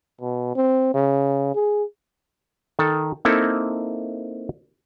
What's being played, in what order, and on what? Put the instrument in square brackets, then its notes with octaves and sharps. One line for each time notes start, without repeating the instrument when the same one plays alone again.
[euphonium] B2
C4
C#3
G#4
[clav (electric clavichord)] D#3 A4
A#3 C4 D#4 E4 A4